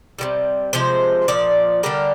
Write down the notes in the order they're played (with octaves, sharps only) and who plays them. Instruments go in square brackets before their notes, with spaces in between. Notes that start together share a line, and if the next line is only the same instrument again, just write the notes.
[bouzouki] C3 D#3 G3
C3 F3 G#3 C5
A#2 F3 D5
D3 G3 G4 A#4